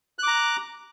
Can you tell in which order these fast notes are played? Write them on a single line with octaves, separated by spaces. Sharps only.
F#6 D6 A#5